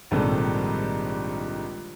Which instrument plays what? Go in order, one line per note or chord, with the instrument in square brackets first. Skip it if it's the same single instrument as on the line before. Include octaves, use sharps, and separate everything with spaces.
[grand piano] A#1 G#2 C3 D#3 G3 A4